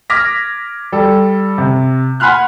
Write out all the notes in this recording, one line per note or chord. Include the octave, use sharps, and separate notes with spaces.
D6 F6 G#6 A#6 B6
G3 A4
C3
F#5 G#5 B5 C6 F6 F#6